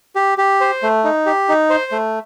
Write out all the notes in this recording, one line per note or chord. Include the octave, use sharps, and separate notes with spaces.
G4
G4
C5
A3
D#4
G4
D#4
C5
A3